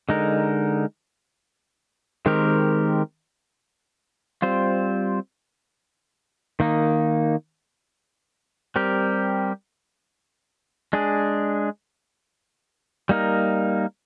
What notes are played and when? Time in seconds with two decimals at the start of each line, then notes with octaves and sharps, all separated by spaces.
0.09 D3 G#3 D#4 A#4
2.26 D#3 G#3 C4 G4 A#4
4.42 G3 C4 F4 C5
6.60 D#3 A#3 D#4
8.76 G3 C4 G4 A#4
10.93 G#3 D4 G#4
13.09 G3 A#3 D#4 A#4